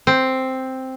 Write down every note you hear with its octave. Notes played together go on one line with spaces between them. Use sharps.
C4